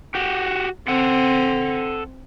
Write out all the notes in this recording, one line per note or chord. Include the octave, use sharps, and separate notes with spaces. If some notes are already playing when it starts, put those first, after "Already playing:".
F#4 G4
C4 A4 F#5